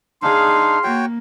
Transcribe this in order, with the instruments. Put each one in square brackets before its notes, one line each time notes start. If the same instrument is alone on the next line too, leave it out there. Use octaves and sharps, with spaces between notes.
[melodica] D4 D#4 [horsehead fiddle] G#4 F5 [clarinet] C6
[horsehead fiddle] A#3 [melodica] F#4 C#5 G5